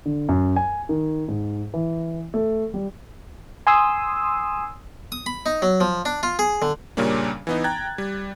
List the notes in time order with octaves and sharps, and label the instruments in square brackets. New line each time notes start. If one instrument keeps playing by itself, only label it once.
[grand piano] D3
F#2
G#5
D#3
G#2
E3
A3
G3
[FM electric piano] G#5 C6 D#6 E6
[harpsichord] D#6
B5
D#4
F#3
F3
D4
F4
G#4
D3
[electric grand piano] A#2 C#3 G3 A#3 C#4 D4
E3 B3 D#4
G5 A#5 F#6 G#6 A6
G3